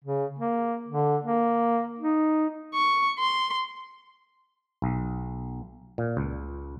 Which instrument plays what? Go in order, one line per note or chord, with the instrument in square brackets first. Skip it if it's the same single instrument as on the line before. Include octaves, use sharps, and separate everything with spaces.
[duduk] C#3
A#3
D3
A#3
D#4
[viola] C#6
C6
[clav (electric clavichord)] B1
A#2
C#2